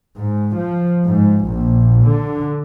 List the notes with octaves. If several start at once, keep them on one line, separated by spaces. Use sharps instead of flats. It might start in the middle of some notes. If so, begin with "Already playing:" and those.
G#2
F3
G#2
A#1
D3